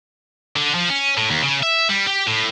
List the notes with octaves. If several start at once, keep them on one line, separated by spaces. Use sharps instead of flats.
D3
F3
C#4
A2
D#2
C#3
E5
G3
G4
A2